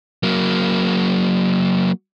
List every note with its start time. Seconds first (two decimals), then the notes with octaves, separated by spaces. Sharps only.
0.23 F#3 A#3